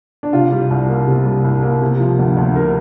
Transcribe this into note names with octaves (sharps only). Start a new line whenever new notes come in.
D4
C3 F4
G3
C2
A#3
C3
G3
C2
A#3
C3
F3
D2
D2
C3 A#4